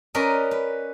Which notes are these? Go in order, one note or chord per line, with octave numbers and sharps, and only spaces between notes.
C#4 A#4 B4 D5 D#5
B4